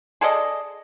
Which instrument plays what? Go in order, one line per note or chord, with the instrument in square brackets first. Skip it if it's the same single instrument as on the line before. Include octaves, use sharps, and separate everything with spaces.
[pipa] G#4 A4 D5 D#5